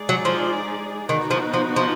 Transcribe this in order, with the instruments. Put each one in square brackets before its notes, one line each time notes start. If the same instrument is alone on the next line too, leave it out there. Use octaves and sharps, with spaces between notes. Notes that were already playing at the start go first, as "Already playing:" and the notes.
Already playing: [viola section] G#3 D#4 G#4 D5
[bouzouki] F#3
F3
[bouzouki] D#3 [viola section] B3 D#4 F#4
[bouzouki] F3
F3
F3